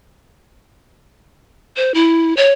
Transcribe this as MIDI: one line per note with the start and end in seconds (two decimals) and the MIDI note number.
1.77 1.94 72
1.94 2.35 64
2.37 2.53 73